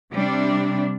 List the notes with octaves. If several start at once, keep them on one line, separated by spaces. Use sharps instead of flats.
C3 G3 D4